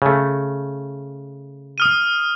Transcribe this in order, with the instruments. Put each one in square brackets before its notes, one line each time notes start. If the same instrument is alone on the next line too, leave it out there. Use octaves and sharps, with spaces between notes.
[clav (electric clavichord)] C#3 A3
[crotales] D#6 F6 D#7